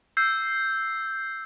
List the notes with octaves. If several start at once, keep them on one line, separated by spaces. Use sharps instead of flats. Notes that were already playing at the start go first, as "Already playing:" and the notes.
E6 G6 C7